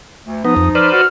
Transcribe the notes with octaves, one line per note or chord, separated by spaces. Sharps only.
D2
F3 B3 D#4 D#6
F2
B4 C5 D5 F6
F#4 F6